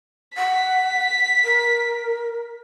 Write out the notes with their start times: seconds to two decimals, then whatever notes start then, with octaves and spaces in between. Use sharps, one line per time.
0.37 F#5 B6
1.44 A#4